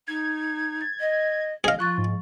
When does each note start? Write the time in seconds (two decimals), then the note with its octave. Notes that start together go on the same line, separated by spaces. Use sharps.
0.08 D#4 G#6
0.81 A6
1.00 D#5
1.64 G#4 D#5 F5
1.79 F3 F4 C#6 F#6 A6
1.98 G#2